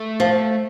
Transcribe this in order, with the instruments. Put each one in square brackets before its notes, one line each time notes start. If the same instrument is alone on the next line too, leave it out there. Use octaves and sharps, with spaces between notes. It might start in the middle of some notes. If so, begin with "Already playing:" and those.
Already playing: [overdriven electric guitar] A3
[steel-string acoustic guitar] F3